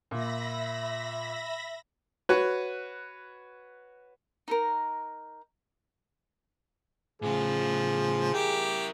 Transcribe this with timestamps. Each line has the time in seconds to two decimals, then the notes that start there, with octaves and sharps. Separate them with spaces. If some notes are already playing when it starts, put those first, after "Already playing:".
0.11 A#2 E5 B5 A#6
2.29 F#4 B4 C#5
4.48 D#4 A4 A#4
7.22 A2 C#3 F3 G#4
8.34 E4 G4 A#4